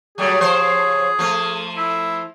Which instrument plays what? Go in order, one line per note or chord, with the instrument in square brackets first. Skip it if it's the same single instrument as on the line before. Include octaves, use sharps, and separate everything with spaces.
[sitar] F#3 G3 A3 [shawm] G#4
[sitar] F3 C5 C#5
F3 A3
[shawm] E4